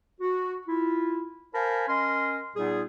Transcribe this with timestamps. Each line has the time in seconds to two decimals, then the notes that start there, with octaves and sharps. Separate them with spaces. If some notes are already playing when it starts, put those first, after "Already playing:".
0.21 F#4
0.68 E4 F4
1.54 A#4 C5 F5 G#5 A5 B5
1.88 C#4 A#4 D#5 C6
2.56 A#2 G3 B3 D#4 G#4